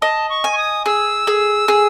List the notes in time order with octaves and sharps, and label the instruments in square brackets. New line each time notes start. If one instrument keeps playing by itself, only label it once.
[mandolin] D#5 [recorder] A5
[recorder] C#6
[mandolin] G#5
[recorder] C#6
D#6
[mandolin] G#4 [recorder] E6
[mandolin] G#4
G#4